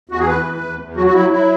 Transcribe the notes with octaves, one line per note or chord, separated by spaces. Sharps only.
E2 F#4
G#4
E3 B4
E2
E2
E2
F#3 F#4
F#4
F#3 E4
F#3 E4